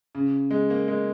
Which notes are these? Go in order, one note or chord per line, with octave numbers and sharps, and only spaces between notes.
C#3
G#3
A#3
G#3